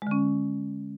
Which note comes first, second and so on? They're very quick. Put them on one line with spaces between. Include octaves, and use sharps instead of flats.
G#3 D3 C#4